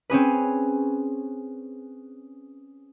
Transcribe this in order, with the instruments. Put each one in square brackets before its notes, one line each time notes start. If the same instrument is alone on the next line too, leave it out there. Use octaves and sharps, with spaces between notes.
[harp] C4 C#4 G#4 B4